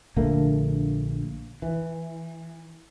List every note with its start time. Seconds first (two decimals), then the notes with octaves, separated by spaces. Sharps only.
0.16 A#1 D3 A3 A#3
1.62 E3